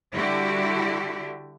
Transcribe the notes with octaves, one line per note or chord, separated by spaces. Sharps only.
D3 G3 E4 F#4 G4